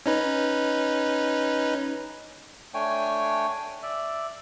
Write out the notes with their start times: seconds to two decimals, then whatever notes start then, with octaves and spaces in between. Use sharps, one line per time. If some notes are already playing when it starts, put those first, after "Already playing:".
0.06 C#4 D#4 B4
2.74 A3 D4 C#5 G5 G#5
3.83 D5 E5